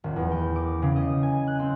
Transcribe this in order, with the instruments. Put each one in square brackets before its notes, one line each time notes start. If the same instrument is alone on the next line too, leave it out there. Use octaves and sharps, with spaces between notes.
[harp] D#1
E2
G5
D6
C#3
D#5
G#5
F#6
C4